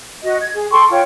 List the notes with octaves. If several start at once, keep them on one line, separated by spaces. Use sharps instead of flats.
F#4 D#5
G#6
G#4
A4 G5 C6 C#6
F4 C#5 G5